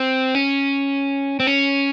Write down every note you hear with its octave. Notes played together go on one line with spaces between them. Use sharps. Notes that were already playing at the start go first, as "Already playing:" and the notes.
Already playing: C4
C#4
C4
C#4